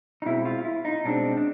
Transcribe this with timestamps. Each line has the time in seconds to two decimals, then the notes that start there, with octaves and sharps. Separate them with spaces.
0.22 D#4
0.26 B2 G#3 C4 E4
0.45 F4
0.65 E4
0.85 D#4
1.05 B2 G#3 C4 D4
1.37 D4